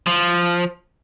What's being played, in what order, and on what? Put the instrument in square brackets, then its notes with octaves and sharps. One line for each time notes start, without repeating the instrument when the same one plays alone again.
[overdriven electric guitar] F3